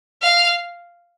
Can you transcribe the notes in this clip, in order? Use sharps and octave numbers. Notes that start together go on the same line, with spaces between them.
F5